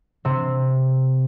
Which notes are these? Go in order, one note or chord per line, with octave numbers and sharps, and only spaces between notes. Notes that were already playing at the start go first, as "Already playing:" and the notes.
C3 C4